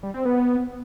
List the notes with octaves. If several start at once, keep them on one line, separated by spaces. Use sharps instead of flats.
G3
C4
B3